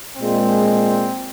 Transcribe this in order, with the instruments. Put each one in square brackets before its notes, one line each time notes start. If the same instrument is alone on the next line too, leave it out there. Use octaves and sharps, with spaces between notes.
[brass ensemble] A#2 G#3 C4